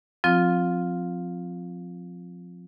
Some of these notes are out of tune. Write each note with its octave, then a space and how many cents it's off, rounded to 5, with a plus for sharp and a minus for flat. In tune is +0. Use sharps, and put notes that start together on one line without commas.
F3 +20 C4 +0 F4 +0